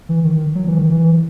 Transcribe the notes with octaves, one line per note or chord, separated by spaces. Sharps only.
E3
D#3
F#3
E3
D#3
E3